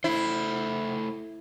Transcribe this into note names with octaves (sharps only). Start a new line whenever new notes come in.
A3 E4 C5